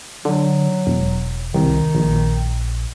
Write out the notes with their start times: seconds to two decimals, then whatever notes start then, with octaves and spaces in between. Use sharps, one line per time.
0.25 D3 F#3
0.87 E1
1.54 C2 D#3
1.95 A#1